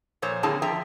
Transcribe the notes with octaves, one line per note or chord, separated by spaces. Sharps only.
A#2 F3 C5 C#5
D3 A#3 C4 E4 G#4 A5
F2 F3 E5 G5 A#5